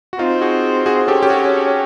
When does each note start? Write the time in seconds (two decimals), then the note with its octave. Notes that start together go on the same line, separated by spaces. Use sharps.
0.13 F#4
0.19 C4 D#4 F4
0.42 F#4 G#4
0.86 F#4 G#4
1.08 C#4 G4 A4
1.23 G4
1.30 F#4 G#4